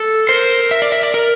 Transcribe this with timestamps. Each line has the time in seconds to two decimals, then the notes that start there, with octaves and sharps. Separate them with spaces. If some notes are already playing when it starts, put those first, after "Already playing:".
Already playing: A4
0.28 A#4 C5
0.71 E5
0.82 D5
0.92 E5
1.03 D5
1.14 A#4